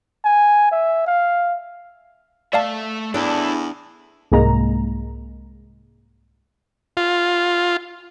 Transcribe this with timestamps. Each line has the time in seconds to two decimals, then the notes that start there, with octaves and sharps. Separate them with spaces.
0.24 G#5
0.72 E5
1.07 F5
2.53 A3 D5 E5 F5 A5
3.14 E2 D4 E4 A4
4.32 C2 G#2 G#3 A#3 A#5
6.97 F4